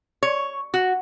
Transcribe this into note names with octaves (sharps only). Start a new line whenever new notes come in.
C#5
F#4